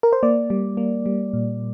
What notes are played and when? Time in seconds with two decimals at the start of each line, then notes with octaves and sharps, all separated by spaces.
0.03 A#4
0.13 C5
0.23 A#3 D5
0.50 G3
0.77 A#3
1.06 G3
1.33 A#2